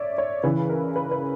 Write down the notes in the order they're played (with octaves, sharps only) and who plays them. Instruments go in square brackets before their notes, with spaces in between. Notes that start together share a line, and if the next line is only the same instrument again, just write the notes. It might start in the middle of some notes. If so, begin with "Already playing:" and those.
Already playing: [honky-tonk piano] C#5 D5 E5
C#5
C#3 E3 B4
A#4
B4
B4